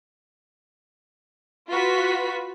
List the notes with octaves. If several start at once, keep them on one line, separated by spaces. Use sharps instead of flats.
F4 F#4 B4 B6